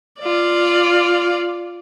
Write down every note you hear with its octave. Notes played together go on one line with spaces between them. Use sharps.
F4 D5